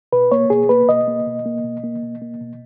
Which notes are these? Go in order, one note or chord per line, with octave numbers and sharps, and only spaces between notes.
B2 B4
A#3 C#5
B2 G#4
A#3 B4
B2 D#5
A#3
B2
A#3
B2
A#3
B2
A#3
B2